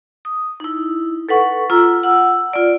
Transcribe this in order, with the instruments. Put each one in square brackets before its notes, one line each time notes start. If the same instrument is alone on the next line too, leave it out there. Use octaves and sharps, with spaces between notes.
[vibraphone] D#6
D#4 E4
A4 B4 F#5 C#6
F4 A#5 E6
F#5 E6
F4 D5